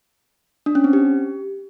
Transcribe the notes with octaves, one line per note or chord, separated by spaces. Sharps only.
D4
C#4
C4
G4